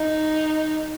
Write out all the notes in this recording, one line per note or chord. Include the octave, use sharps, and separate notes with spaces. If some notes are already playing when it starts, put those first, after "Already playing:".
Already playing: D#4